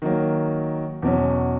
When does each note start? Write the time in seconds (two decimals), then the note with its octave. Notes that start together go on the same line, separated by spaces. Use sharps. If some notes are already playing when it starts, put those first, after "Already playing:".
0.02 D#3 F#3 A#3
1.02 E2 B2 F#3 C#4